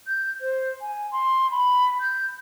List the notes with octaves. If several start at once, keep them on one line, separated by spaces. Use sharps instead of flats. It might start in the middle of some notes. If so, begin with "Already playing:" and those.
G6
C5
G#5
C6
B5
G6